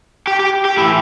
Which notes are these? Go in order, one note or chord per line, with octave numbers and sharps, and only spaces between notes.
G4
G4
G4
A2 E3 E4